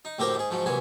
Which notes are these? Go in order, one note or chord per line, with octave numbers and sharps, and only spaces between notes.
D#4
D2 A2 C4 G4 A#4 G5
G#2 G#4
G#2 F3 F#3
C2 A#2 E3 F#3 G#5